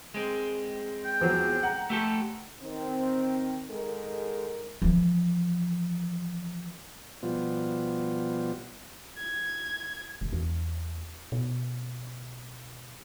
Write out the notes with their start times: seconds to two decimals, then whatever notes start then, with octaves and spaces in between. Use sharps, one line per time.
0.14 G#3 C4
1.05 G5
1.20 E2 F3 F#3
1.63 F#5 A#5
1.90 A3 G4 A4
2.62 D#3 C4
3.70 G#2 D#3 G#3 A4 A#4
4.82 E3 F3
7.23 B2 F3 G3 B3 F4
9.18 G#6
10.21 F#1
10.32 E2
11.32 B2